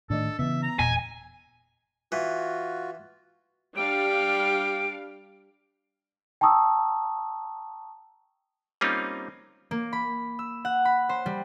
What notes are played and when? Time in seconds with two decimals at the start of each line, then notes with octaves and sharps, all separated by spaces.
0.10 A2 D#3 A3 D4 A4 D5 D#5
0.39 C#3 E3 B3 E5
0.63 A#5
0.79 E1 A#2 D#5 G#5
2.12 E3 F4 F#4
3.77 G3 D4 G4 F5 D7
6.41 G5 A5 A#5 C#6 D#6 E6
8.81 G3 A#3 C4 C#4 D#4 F4
9.71 A#3
9.93 B5
10.39 E6
10.65 F#5
10.85 B5
11.09 C5
11.26 G3